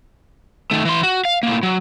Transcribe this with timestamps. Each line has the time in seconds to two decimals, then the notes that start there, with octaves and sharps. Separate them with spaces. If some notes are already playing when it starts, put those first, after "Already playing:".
0.71 D#3 A3
0.85 E3 C6
1.03 F#4
1.25 F5
1.43 A2 A#3
1.63 F#3